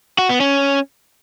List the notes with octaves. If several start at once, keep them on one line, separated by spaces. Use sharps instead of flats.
F#4
B3
C#4